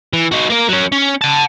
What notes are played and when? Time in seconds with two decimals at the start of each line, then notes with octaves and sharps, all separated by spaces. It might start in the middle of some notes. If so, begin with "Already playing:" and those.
0.13 E3
0.32 D#4 F#4
0.50 A#3 A#4
0.69 F#3 C#4
0.92 C#4
1.21 F#5 A5